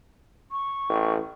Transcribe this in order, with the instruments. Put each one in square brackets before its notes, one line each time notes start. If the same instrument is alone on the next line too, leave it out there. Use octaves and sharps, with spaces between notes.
[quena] C#6
[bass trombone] A1